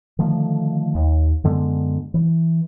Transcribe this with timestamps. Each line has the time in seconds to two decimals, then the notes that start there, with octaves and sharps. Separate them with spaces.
0.19 D3 D#3 F3 A3
0.95 D#2
1.44 F#2 D3 G#3 B3
2.14 E3